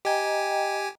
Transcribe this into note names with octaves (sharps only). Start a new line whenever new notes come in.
G4 D#5 G5 G#5 A#5